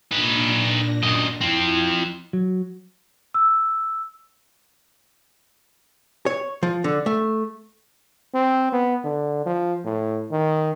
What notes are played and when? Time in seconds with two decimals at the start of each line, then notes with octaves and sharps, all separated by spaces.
0.12 A#2 D4 D#4 B4 A#6
1.03 F#2 D#5
1.41 F3 C4 E4
2.33 F#3
3.34 E6
6.26 C#5
6.63 F3
6.84 D3
7.06 A3
8.34 C4
8.72 B3
9.04 D3
9.46 F3
9.85 A2
10.31 D#3